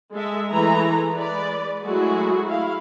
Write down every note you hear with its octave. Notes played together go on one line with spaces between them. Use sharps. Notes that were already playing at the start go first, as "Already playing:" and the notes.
G#3 A4 E5
E3 G#3 A3 B4 A#5
G#3 B4 D5
F#3 G#3 A3 E4 F#4 G#4
E4 F5